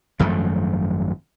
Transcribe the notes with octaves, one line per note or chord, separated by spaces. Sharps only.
G#1 F#2 F3 A3